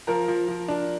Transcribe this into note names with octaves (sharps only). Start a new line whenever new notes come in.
F3 A#4 A#5
F3
F3
D4